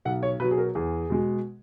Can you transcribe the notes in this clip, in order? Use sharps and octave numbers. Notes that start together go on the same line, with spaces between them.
B1 F#5
C#5
B2 F#3 B4
G#4
A#4
E2 G#4
B2 G#3